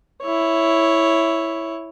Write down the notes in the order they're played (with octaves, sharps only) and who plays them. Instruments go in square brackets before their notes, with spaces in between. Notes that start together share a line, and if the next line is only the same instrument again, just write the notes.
[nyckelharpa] E4 C#5